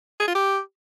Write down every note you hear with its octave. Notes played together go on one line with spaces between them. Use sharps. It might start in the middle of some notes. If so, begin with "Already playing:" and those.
G#4
F4
G4